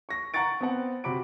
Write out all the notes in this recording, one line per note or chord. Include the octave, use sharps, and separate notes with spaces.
C#6 A#6
F#5 A#5 C#6 A6 D7
B3 C4 F#5
C3 F#4 B5 D6 D7